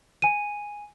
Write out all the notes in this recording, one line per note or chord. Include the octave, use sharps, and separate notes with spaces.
G#5 D#7